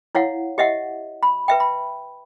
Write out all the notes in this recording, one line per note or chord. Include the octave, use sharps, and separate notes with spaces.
E4 C#5 F5 F#5
G4 D#5 E5 F#5
B5
B4 E5 G5
B5